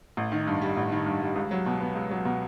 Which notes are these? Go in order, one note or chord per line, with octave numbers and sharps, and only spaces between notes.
A1
D#3
G2
G3
A1
D#3
G2
G3
C#2
F#3
B2
B3
C#2
F#3
B2